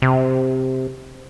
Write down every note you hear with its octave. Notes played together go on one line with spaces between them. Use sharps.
C3